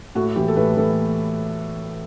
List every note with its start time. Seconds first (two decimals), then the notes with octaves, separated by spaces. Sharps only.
0.15 A2 F#4
0.36 E3 G4
0.48 A4
0.56 A2 B4
0.77 E3 A4